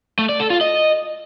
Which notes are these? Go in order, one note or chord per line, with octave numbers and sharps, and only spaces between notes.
A3
D5
A4
F4
D#5